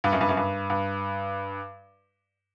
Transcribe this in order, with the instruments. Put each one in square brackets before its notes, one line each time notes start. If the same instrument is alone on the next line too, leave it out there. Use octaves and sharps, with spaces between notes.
[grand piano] G2
F#2
G2
F#2
G2
G2